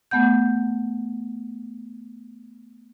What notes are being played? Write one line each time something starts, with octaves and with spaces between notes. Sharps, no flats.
A3 B3 F#5 G6